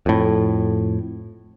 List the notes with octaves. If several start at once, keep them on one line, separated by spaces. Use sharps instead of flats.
F2 A2